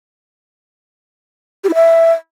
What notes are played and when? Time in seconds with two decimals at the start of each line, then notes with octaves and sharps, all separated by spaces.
1.64 G4
1.69 E4
1.74 E5